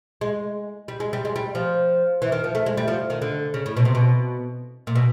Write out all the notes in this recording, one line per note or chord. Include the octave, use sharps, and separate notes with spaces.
G#3
G3
G#3
G3
G#3
G3
F3
E3
D#3
F3
A3
G#3
G3
F3
D#3
D3
C#3
A2
B2
C3
B2
A#2
B2